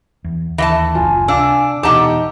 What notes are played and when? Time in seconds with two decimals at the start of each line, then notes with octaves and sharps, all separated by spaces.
0.24 E2
0.58 D#2 E3 E5 A5
0.95 F#1 C#2 F4 G#5
1.28 C3 D4 F5 E6
1.83 E2 B2 D#4 G4 F#5 A5 A#5 D6